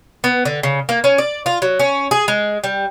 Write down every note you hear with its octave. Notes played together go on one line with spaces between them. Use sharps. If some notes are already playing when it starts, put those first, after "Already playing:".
B3
D3
C#3
A#3
C#4
D5
F4
F#3
C#4
G#4
G#3
G3